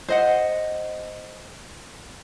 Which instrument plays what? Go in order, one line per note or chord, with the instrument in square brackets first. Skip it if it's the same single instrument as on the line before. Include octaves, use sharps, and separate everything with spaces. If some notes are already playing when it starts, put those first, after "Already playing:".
[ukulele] C5 D#5 F#5